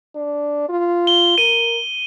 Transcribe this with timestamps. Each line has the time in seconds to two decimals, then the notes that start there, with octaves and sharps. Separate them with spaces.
0.15 D4
0.69 F4
1.07 G7
1.38 A#4 D#7